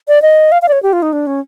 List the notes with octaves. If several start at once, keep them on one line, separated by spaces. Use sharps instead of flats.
D5
D#5
F5
F5
D5
C#5
G4
F4
D#4
D4
C#4